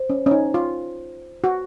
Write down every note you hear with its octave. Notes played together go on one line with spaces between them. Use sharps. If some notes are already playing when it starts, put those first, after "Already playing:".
Already playing: C5
C#4
C#4
D#4
F4
F#4